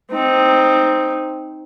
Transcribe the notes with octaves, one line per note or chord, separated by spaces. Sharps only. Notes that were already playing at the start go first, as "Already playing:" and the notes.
C4 D#4